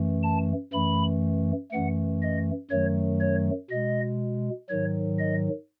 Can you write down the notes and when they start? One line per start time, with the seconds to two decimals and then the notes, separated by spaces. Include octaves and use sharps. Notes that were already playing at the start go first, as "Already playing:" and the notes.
Already playing: F#2 E3 A3
0.23 A5
0.73 F#2 E3 A3 B5
1.72 F#2 E3 A3 F#5
2.22 D#5
2.71 F#2 D#3 F#3 A3 C#5
3.21 C#5
3.71 B2 G#3 D#5
4.70 G#2 D#3 F#3 C#5
5.19 D#5